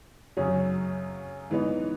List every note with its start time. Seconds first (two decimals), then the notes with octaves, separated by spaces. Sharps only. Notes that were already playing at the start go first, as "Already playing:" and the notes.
0.37 F#2 C#3 F#3 C#4 G#4
1.50 G#2 E3 B3 D#4